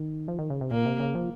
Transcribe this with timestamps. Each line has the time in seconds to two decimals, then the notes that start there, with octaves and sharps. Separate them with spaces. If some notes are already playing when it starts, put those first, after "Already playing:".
Already playing: D#3
0.28 F3
0.39 D#3
0.50 C#3
0.61 C3
0.71 A#2 A#3
0.86 C3
1.00 C#3
1.15 F3